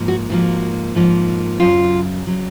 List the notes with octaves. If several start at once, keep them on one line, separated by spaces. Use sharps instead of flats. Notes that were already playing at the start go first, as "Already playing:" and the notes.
Already playing: G#2 F3 A#3
F#4
G#2 F3 A#3 F#4
G#2 F3 A#3
F#2 C#3 F#3 F4
C#3 F#3